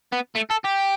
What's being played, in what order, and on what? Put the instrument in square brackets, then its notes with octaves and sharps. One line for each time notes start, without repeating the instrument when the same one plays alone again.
[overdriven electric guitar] B3
A3
A4
G4